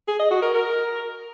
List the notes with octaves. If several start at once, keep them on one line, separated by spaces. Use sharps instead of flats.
G#4
D#5
F#4
A#4
A#4